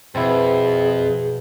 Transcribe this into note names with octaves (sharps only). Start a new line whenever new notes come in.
F2 B2 C4 E4 G#4